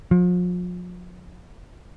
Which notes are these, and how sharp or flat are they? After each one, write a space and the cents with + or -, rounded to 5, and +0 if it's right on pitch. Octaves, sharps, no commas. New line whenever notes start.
F3 +40